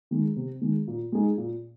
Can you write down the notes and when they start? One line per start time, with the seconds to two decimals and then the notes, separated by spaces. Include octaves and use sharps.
0.11 D#3 G#3
0.36 C3
0.61 D#3 G#3
0.87 A#2
1.12 G#3 D#4 G#4
1.38 A#2